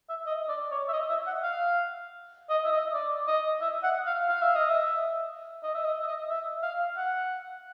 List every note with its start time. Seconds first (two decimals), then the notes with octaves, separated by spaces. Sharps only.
0.09 E5
0.26 D#5
0.49 D5
0.71 C#5
0.88 E5
0.93 D#5
1.10 E5
1.27 F#5
1.43 F5
2.50 D#5
2.65 E5
2.72 D#5
2.94 D5
3.27 D#5
3.61 E5
3.83 F#5
4.06 F5
4.28 F5
4.42 E5
4.55 D#5
4.69 E5
5.63 D#5
5.74 E5
5.85 D#5
6.02 E5
6.07 D#5
6.29 E5
6.62 F5
6.97 F#5